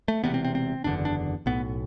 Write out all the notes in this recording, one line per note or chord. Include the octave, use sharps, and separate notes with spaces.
A3
E1 E2 C3 B3
C4
C4
C4
F#1 E2 D3 D4
D4
B1 A2 B3